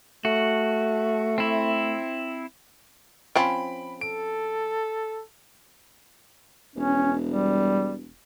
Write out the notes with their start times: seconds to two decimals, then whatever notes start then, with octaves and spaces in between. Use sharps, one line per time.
0.25 A3 F#4
1.38 C4 E4
3.36 F3 C4 C#4 B5 D7
4.01 A4 D7
6.76 E1 C#4
7.30 G3